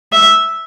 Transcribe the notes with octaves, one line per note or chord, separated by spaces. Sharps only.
E5